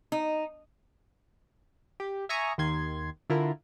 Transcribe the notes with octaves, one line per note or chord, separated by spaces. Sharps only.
D#4
G4
E5 G#5 A#5 C#6 D#6
D#2 D#3 C6 G#6
D3 E4 F4 A#4